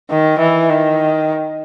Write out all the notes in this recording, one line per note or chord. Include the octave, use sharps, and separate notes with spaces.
D#3
E3
D#3